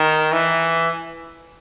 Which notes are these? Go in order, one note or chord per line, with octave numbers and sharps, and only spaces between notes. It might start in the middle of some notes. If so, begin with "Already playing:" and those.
Already playing: D#3
E3